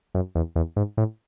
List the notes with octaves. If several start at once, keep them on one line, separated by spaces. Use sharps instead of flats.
F#2
E2
E2
G#2
A2